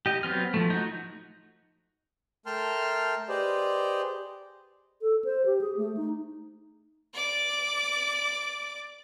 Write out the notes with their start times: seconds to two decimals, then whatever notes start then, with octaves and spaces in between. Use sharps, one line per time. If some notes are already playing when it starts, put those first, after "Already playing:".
0.06 G4 D#5
0.23 F#3 B3 C4 F6
0.54 F3 A3
0.70 D#4 F#4
2.46 A3 A#4 G5 A5 C6 F6
3.29 G4 G#4 B4 C5 D5 D#5
5.02 A4
5.25 C5
5.46 G4
5.61 G#4
5.77 A3
5.97 D#4
7.14 D5 D6